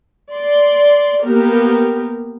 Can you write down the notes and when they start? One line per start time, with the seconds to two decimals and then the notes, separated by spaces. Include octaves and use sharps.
0.32 D5 C6
1.24 A#3 B3 G4 A#4